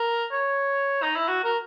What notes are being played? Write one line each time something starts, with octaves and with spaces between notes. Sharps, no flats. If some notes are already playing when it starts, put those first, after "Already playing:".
Already playing: A#4
C#5
D#4
E4
F#4
A#4